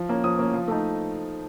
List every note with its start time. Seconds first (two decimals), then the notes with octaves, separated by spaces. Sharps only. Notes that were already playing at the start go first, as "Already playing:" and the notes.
Already playing: F3
0.09 A#3 C#4
0.24 F3 D#6
0.39 A#3 C#4
0.53 F3
0.68 A3 D#4